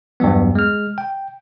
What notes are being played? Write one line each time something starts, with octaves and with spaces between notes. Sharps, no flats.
E2 G2 F#3 G3 B3
G#3 F6
G5